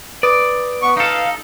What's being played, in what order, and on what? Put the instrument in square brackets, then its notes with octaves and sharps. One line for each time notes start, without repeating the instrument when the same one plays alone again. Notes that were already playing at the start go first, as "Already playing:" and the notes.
[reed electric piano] B4 D#6 [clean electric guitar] D5
[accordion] B3 C#6
[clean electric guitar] D#4 A4 [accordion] F5